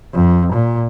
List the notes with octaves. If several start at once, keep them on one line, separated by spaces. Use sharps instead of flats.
F2
A#2